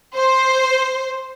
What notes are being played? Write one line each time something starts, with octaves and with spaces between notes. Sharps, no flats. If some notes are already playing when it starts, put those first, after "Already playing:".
C5